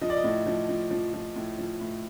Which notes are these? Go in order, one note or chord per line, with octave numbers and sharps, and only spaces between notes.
F3 D#5
D5
D#5
A2
F3
F3
F3
F3
A2
F3
A2